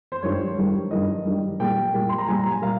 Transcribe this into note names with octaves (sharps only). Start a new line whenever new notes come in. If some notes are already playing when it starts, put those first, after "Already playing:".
C5
G2 D#3 G3 C#5
G2 D#3 G3
G2 D#3 G3 D#5
G2 D#3 G3
A#2 G3 A#3 G5
A#2 G3 A#3
C6
A#5
A#2 G3 A#3 G#5
A#5
G#5
A#2 G3 A#3 F5